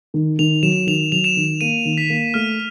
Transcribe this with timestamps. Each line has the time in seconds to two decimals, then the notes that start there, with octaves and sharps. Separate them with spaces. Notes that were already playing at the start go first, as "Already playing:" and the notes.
0.14 D#3
0.39 D#3 F7
0.63 F#3 E7
0.87 D#3 F7
1.12 F#3 F7
1.24 E7
1.37 D#3
1.61 A#3 D#7
1.85 D#3
1.98 B6
2.10 A#3
2.34 A3 F6